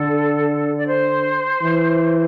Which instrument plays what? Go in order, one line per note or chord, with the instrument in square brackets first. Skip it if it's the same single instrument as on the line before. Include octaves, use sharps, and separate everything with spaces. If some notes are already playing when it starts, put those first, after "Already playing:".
Already playing: [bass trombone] D3 [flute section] A4
[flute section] D5
C5
[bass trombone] E3